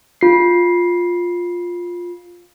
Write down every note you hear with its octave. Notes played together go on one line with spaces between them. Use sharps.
F4 C7